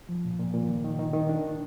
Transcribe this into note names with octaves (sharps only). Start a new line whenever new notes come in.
F3
A#2
A#2
A#2
D#3
D#3
D#3
D#3
D4